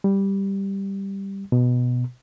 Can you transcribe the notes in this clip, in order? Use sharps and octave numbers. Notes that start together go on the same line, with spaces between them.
G3
B2